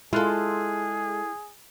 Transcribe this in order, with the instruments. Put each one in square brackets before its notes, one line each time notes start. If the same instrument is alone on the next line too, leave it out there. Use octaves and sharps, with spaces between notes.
[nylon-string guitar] G#3 [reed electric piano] E4 F6 F#6 [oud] F4 A4 [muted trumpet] G#4